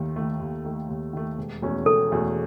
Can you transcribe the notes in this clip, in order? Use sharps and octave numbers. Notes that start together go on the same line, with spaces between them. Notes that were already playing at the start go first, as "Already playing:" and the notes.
Already playing: D#2 D#3 A3
D#3 A3
D#2
D#3 A3
D#2
D#3 A3
E1
E2 B2 A3 C#4
E1 A4
E2 B2 A3 C#4